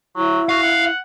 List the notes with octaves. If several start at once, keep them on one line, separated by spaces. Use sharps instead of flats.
F#3 E4
F#4 F5
F#5